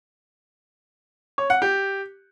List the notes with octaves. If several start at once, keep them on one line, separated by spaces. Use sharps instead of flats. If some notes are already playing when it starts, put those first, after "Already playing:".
C#5
F#5
G4